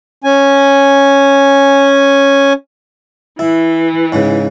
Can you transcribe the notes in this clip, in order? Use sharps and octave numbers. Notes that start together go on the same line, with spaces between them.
C#4 G#5
E3 E4
G#2 C#3